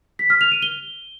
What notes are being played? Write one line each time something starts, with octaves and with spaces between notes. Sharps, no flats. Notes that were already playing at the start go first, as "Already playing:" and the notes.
B6
F6
F7
D#7
G7